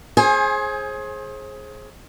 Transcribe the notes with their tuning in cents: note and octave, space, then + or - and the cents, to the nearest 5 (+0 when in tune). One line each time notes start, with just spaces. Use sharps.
G#4 +15 C5 +35 G#5 +0